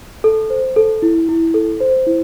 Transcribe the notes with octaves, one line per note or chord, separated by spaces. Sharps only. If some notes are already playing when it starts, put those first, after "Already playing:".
A4
C5
A4
E4
E4
A4
C5
E4